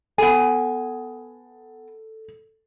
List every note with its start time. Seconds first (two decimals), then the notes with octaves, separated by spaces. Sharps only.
0.18 B3 A4 G#5